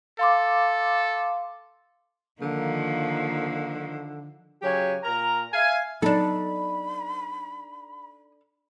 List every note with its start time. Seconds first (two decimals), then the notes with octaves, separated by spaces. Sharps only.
0.19 A4 F5 C6 D6
2.41 D3 D#3 F3 A#3
4.62 C#3 F#3 G4 C#5 G#5
5.03 A#2 A#4 A#5
5.53 E5 F5 G#5
6.02 F#3 B3 D4 D#4 A4 B5